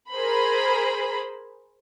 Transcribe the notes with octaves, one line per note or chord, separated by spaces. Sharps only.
G#4 A#4 C5 B5